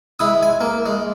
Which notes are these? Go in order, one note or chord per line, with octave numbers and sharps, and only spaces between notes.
G#3 E4 D#6
G#5
A#3
G#3